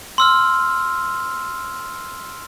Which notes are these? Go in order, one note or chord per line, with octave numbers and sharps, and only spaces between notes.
C6 E6 F6